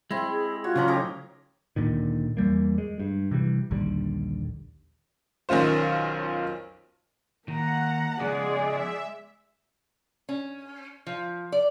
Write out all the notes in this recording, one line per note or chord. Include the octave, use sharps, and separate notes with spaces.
G#3 C4 E4
G#4
F4 F#4 C#5
C#3 F3 F#3 C#4 A#5
A2 D#4 G4
D2 A#2 D3 D#3
E2 E3 G3 A#3
G#3
G2
C3 E3 G3
A#1 D#2 D3 G3
B1 D#3 C#4 F4 C5
D#3 A#3 F#5 A#5
C#3 F3 G#3 B3 G#4 D5
E5
C#4
F3
D5